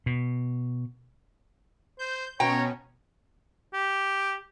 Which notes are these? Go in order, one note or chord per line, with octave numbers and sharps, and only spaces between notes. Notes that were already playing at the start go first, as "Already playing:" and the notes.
B2
C5 G6
B2 C#4 C#5 G5 A#5
G4